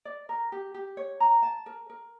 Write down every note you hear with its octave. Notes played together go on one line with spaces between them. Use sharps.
D5
A#4
G4
G4
C#5
A#5
A5
A#4
A#4